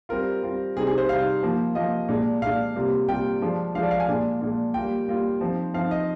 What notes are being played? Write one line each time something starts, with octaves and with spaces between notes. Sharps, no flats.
G3 C4 F4 A#4
G3 C4 F4
C3 G3 C4 D#4 G#4
G#4
C5
C3 G3 C4 D#4 F5
F3 A#3 F4
F3 A#3 F4 D#5
A#2 G#3 D4
A#2 G#3 D4 F5
C3 G3 A#3 F4
C3 G3 A#3 F4 G5
F3 G#3 D4 F4
F3 G#3 D4 F4 F5
D5
F5
G#5
A#2 G#3 D4 F4
A#2 G#3 D4 F4
G3 A#3 F4 G5
G3 A#3 F4
F3 C4 D#4
F3 C4 D#4 F5
D#5